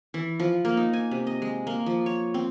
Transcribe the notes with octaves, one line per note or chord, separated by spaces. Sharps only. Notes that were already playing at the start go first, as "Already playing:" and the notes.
E3
F3
A#3
D#4
G#5
C3
D#5
G#3
A#3
F3
C#5
C4